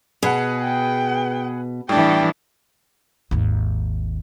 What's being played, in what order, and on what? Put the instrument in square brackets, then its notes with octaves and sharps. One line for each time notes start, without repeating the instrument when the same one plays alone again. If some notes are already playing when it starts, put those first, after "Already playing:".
[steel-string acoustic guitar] B2 [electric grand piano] G#4 B4 F#5
[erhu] G5
[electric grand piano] A2 G3 [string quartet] E3 D4 [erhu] G5
[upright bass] G#1 D#2